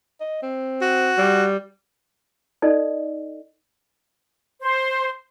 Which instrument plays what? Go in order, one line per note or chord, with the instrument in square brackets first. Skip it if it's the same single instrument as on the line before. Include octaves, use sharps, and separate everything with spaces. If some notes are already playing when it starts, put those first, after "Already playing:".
[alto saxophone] D#5
C4
[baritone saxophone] F#4
[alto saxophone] G3
[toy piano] D#4 A4 D5 D#5
[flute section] C5